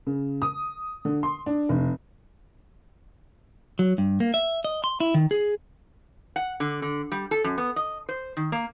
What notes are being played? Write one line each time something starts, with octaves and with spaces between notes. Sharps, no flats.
C#3
D#6
D3
C6
D4
F1
F#3
G2
A#3
E5
D#5
C6
E4
D#3
G#4
F#5
D3
D3
G3
A4
F#2
B3
D#5
C5
D#3
A#3